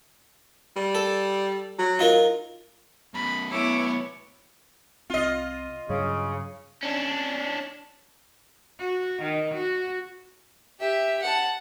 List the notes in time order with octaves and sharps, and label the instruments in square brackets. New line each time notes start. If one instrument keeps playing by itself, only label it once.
[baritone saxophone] G3
[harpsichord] A4
[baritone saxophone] F#3
[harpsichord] D#4 F4 A#4
[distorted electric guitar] F#2 B2 [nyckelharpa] B5
[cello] B3 C#5 [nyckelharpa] E4 D6
[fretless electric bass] C2 C4 [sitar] F4 D#5
[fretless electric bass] G2 F#3 [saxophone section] C#3
[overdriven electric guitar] C#4 D4
[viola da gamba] F#4
D#3
F#4
[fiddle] G4 E5
F#5 A5